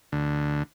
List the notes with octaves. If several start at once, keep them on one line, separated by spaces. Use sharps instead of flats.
D2